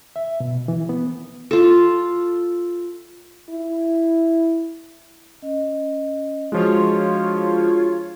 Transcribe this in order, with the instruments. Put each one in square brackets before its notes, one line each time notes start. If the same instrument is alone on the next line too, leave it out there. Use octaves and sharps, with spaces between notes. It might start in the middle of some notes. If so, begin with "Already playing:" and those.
[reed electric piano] E5
B2
E3
B3
[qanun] F4 A4
[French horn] E4
[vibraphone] C#4 D#5
[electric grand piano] F3 G#3 [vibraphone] D4 F#4 G#4 [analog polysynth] F4 C#5